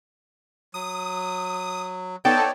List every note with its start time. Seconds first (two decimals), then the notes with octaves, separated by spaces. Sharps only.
0.74 F#3 D#6
2.25 B3 D#4 A4 C#5 D5 G5 A5